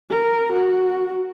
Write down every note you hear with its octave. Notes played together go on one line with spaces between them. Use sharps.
A#4
F#4